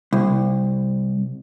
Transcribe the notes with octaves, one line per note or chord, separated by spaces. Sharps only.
C2